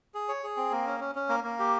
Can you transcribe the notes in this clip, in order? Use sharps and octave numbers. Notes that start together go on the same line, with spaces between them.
G#4
C#5
G#4
C4
A#3
C#4
C#4
C#4
A#3
A#3
G4